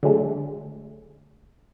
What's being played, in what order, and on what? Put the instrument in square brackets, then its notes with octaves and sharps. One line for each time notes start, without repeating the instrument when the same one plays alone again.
[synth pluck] D3 F#3 G#3 A3